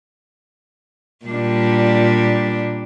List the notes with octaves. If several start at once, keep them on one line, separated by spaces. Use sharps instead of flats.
A#2 G3 D4